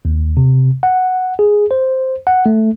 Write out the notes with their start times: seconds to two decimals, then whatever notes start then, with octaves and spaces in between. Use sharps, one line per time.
0.05 D#2
0.37 C3
0.83 F#5
1.39 G#4
1.71 C5
2.27 F#5
2.46 A3